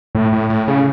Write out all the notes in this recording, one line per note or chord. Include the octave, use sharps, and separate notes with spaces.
A2
A2
A2
C#3